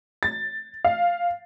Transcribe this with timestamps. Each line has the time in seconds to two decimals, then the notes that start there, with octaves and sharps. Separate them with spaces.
0.23 A6
0.85 F5